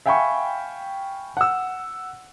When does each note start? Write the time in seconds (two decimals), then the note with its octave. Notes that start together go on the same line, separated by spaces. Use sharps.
0.06 E5 F5 G5 G#5 B5 C#6
1.37 F#5 E6